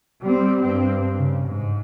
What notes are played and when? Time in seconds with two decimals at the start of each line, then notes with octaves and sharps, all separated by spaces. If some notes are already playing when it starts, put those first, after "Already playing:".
0.22 G3 C4
0.62 G2 C4
1.18 C#3
1.46 G#2